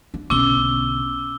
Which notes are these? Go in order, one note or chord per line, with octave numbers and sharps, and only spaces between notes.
D4
B1 D3 C#4 D6 E6 G7